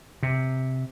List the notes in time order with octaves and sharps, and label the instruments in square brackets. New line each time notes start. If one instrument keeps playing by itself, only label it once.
[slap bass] C3